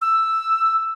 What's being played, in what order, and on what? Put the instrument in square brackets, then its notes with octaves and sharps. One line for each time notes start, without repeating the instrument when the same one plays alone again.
[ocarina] E6